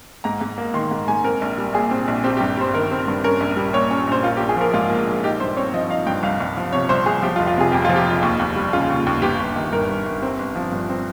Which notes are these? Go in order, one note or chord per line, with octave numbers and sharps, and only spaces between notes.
G#2 A#5
G#2
A#3
D#3 C6
G#2
G#2 G#5
C4 A#4
A#1
G3
A#2 G#4
C4
A#1
C4 G4
G4
G2
G3 C5
D#3 A#4
C4
G2
C#4 A#4
A#1
G3
A#2 C#5
C#4
A#1 C5
A#3 F4
G4
A#1
G#4
F3 A#4
G#2 F4
A#3
A#1
D#4 G4
G2 C5
C4 C#5
F3 D#5
D#4 F5
G2 G5
C2 F5
C2
F3
C3 C#5
C2 C5
C2 G#4
F3 G4
F4
F1
F4
C3 G#4
F2 G4
F3 F4
G4
F1
D#2
D#2
G3
C#3 F4
D#2
D#2
G1 G4
G1
D#3
G2 A#4
G1
G1
C4
G1
F3
G2
C4